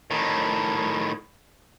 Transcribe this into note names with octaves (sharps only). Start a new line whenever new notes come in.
A2 D#3